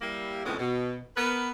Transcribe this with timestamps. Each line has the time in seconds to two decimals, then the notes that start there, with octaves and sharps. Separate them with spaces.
0.01 G3 A#3 E4
0.45 F2 A2 C#3 G#3 B3 C#4
0.59 B2
1.17 B3 A#4 B4